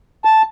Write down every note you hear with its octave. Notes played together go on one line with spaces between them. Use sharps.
A5